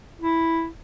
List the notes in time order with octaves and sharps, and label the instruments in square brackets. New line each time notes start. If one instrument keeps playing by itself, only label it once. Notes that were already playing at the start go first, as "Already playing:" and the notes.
[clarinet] E4